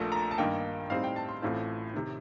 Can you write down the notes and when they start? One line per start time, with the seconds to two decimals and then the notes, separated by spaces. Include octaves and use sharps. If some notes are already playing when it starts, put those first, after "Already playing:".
Already playing: A#1 A#2 A3 A5
0.12 A#5
0.31 A5
0.38 G2 D#3 A#3 D#4 G5
0.90 A2 G3 C4 D#4 F5
1.04 G5
1.16 A5
1.29 C6
1.42 A1 A2 A3 C4 F4
1.93 C3 D#3